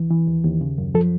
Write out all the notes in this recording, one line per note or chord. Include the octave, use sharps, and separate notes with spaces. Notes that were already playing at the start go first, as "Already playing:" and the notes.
Already playing: C2 E3
E3
D#2
D#2
C#3
F#2
F3 A4